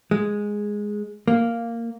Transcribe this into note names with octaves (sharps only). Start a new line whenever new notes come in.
G#3
A#3